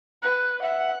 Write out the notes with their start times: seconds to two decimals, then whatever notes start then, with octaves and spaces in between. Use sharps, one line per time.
0.23 B4 F#6
0.62 E5 F#5